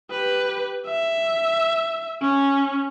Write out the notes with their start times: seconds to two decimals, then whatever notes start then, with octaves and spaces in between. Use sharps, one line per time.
0.11 G4 B4
0.87 E5
2.22 C#4